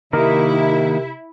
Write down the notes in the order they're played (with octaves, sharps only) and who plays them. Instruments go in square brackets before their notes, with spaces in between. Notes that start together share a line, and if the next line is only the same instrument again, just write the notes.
[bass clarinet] C3 [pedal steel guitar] D#3 A#3 D#4 [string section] E4 [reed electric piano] A#4